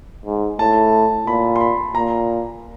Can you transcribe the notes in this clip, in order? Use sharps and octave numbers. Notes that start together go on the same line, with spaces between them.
G#2
A2 A5
A#2 B5
C6
B5
A#2 A#5